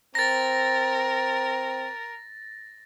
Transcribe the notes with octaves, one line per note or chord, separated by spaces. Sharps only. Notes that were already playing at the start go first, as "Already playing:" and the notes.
C4 A#4 A6 A#6